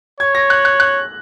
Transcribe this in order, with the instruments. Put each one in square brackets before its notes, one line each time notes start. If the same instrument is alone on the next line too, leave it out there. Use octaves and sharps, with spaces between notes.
[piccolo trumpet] C#5 [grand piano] G#6
[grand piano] A#6
F#6
F#6
F#6